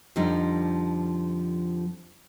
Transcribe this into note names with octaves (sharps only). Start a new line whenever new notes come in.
F2 D3 F3 G3 D#4